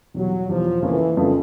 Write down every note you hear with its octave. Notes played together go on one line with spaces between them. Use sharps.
E2 B2 F#3 G3
E2 B2 F3 G3
F2 C#3 E3 F3 A#3 C#4
F2 C#3 F3 A#3 C#4